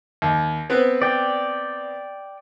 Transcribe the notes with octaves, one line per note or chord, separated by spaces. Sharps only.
D#2
B3 C4 B4
D5 G5